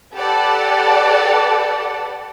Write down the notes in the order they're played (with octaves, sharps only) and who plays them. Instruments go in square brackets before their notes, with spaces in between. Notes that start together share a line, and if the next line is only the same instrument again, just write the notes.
[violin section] G4 A4 B4 D5 F#5 A5